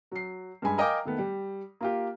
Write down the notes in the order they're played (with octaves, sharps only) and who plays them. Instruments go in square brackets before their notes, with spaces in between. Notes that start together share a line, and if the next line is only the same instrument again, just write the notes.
[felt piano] F#3 C7
G2 G#3 G#5 B5
A#4 D#5 F5 G5 G#5 D6
D#3 A3 B3
G3
A#3 F4 G4